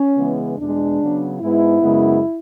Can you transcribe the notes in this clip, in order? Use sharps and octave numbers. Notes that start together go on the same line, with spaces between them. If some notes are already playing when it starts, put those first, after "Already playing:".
Already playing: C#4
C#3 E3 G#3 B3
E2 B2 G#3 D4
C#3 F#3 B3
G#2 G#3 B3 E4
F#2 C#3 G#3 B3